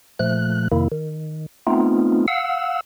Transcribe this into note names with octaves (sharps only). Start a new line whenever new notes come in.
A#2 F3 A3 F#6
F2 C3 D#3 A#3 E4
D#3
A3 B3 C4 D#4 F4
F5 F#5 E6